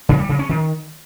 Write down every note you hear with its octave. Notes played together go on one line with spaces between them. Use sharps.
C#3
G3
C#3
C#4
D#3